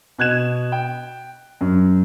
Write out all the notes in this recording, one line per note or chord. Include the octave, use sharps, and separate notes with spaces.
B2 F#6 G#6 E7
G5
F#2